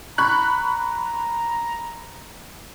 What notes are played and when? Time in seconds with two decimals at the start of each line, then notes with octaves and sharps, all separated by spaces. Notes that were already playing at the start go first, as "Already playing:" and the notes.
0.18 A#5 B5 C#6 F#6